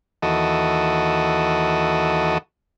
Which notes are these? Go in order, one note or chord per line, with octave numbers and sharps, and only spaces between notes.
D#2 E3 F#4 A4 D#5